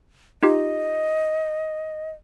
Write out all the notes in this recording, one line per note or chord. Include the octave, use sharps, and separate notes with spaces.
D#4 F4 G4 D#5